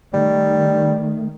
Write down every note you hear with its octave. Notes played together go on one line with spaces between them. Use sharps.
D#3 G3 A3